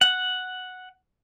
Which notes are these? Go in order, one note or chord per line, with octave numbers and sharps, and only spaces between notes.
F#5